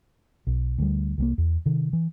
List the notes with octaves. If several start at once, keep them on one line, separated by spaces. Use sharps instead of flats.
B1
D2 G3
C2 G3 A#3
E2
C3 D#3
E3